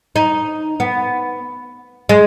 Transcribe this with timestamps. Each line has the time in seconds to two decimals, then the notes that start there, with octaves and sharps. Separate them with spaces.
0.16 D#4
0.80 B3
2.09 G#3